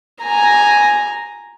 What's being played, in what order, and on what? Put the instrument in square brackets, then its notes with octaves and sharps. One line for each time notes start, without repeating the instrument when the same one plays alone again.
[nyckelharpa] G#5 A#5